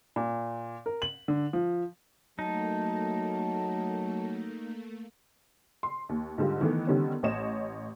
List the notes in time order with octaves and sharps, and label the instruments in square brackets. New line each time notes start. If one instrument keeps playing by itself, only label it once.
[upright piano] A#2
A#4
F#7
D3
F3
[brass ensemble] F#3 [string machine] A3 A#3 [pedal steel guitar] D#4 [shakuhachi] A5
[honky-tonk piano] C6
D#2
G#2 D3 G3 F4
D#3 E3 A3 B3
D3 D#3 G3 B3 C#4
A1 C#5 D#5 E7